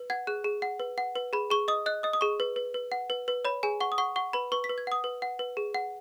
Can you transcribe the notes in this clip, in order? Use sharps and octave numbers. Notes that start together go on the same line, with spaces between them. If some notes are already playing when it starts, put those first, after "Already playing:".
Already playing: B4
F#5 G#6
G#4 F#6
G#4
F#5
B4
F#5
B4
G#4 B5
G#4 C#6
D#5 D#6
D#5 F#6
D#5 D#6
D#6
G#4 C#6
B4
B4
B4
F#5
B4
B4
C#5 B5
G#4 G#5
F#5 C#6
D#6
F#5 C#6
F#5 C#6
B4 B5
B4 C#6
B6
B4
G#6
F#5 D#6
B4
F#5
B4
G#4
F#5